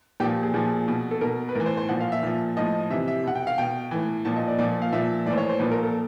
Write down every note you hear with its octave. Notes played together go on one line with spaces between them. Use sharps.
A#2 F3 G4
G#4
A#2 F3 G#4
B2
A4
B2 A#4
B4
A2 E3 A#4
C5
C5
A#2 F3 F#5
F5
E5
A#2 F3
A2 F3 D#5
C3 E3 E5
E5
B2 F#5
G5
F5
B2 G5
A2 E3
A#2 F3 A5
D#5
D5
A#2 F3 D5
F5
A#2 F3 E5
A2 E3 C5 D5
C#5
C5
A#2 F3 B4
A#4
A4